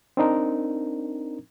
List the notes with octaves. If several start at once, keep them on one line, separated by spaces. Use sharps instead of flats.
C4 D4 D#4 A#4